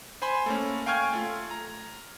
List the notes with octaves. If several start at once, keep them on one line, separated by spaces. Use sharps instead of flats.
C5 G#5 B5 C6
A3 A#3 C#4
F5 G5 G#5 C#6 F6 G#6
A3 F4
A#5